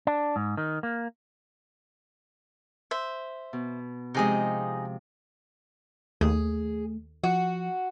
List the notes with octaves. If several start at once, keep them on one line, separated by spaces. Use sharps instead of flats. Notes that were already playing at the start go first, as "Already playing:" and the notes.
D4
G#2
D#3
A#3
C5 E5
B2
C3 F3 G#3 D#4 G#4 D#5
D#2 A3 G#4
F3 F#4